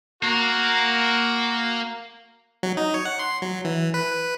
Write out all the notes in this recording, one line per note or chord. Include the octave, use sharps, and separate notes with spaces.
A#3 F#4 A#4
F#3
D#4
C#5
F#5
C6
F#3
E3
B4
B4